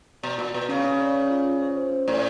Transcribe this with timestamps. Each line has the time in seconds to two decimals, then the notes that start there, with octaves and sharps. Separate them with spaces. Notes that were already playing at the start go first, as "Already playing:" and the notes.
0.23 B2 D5
0.38 A#2 F#4
0.54 B2 B4
0.69 C#3 C#4
0.84 C#4
1.00 D5
1.15 C#4
1.30 F4
1.45 F4
1.61 C5
1.77 C5
1.91 C#4
2.08 A2 D5